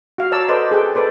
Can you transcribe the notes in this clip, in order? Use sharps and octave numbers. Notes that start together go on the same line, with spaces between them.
F#4 F5
C#5 D5 A5 A#5 E6
A4 B4 C5 D5 D#5
G#4 A4 G5
A4 B4 C5 D5